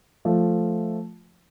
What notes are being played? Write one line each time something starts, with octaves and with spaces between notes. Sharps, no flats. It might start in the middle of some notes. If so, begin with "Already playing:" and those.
F3 A3